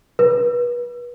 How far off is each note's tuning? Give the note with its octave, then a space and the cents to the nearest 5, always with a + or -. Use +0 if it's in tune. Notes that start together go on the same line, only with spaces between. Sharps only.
B4 -30